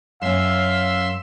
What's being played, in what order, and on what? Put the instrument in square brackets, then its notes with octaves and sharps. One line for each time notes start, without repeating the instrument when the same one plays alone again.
[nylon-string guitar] F#2 C#4 [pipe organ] E5 C6 E6 [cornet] F5